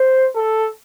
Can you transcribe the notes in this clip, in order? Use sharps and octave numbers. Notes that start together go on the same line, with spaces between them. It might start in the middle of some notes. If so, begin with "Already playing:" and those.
Already playing: C5
A4